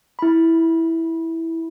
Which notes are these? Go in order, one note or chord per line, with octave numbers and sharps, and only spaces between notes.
E4 B5